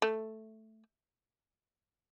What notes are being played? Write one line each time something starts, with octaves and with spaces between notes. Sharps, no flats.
A3